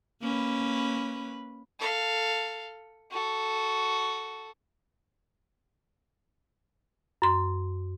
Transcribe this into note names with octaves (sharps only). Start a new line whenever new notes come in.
A#3 C#4 B4
A4 F5
F#4 A4
F#2 C6